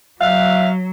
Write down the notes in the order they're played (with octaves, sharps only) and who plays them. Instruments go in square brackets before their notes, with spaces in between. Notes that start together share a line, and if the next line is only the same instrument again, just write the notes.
[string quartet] F#3 [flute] E5 [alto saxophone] F5